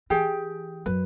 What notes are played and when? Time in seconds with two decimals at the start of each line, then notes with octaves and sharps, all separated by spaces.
0.10 E3 G4 G#4 G5
0.86 F#2 B4